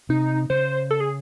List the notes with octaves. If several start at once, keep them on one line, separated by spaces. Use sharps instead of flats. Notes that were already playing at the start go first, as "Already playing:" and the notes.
C3 D#4
C#3 C5
A4
G#4